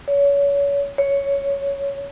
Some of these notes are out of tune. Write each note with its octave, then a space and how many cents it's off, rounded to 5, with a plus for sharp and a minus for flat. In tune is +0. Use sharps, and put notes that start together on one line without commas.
C#5 +30
C#5 +5